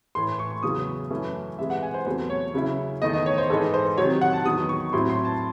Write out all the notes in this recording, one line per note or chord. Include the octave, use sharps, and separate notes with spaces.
A2 E3 A3 C6
C#6
E2 C#3 F#3 C#4 D#6
F#2 E3 A3 C#4 E4
C3 E3 G#3 E5
F#5
G#5
C5
E2 C3 F#3 A3 C5
C#5
C#3 F#3 C#4 E4
E2 D#3 A3 D#4 D#5
D#5
C#5
C5
G#2 E3 G#3 D#4 A4
C5
C3 D#3 F#3 C#5
F#5
A5
E2 D#3 F#3 D#6
C#6
A2 F#3 C4 E4 C6
C6
A5